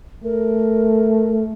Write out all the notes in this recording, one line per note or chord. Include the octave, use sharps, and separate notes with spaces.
A3 A#4